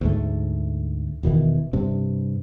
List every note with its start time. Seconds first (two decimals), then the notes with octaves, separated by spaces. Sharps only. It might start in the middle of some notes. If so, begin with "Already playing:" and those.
0.01 D2 G#2 A3
1.23 E1 B2 D#3 E3
1.73 G2 C3